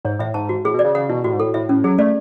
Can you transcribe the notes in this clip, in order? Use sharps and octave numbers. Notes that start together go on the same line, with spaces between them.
G#2 C#5
A2 E5
G#2 A5
F#4
A2 G#4
B2
D5
C#3
C#3 F#5
B2 E4
A2 F#4
G#2
A2 A4
A2 E5
A2 C#4
F#3 G#4
A3 D5